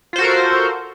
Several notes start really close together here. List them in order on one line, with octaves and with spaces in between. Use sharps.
F4 C5 F#4 A4 A#4